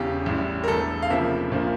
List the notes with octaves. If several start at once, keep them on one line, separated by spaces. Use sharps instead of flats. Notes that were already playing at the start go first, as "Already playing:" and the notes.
Already playing: E1 E2 C#3 G4
A1 A2 G3
A#4
E1 E2 E3 A3 A4
F5
F1 F2 C#3 F3 A#3 E5
A#1 A#2 F3 A#3